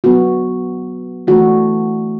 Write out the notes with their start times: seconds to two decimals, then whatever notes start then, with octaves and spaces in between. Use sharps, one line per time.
0.04 F#3 B3 D4 F#4
1.27 E3 A3 D4 F#4